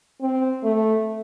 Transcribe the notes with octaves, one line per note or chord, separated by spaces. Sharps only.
C4
A3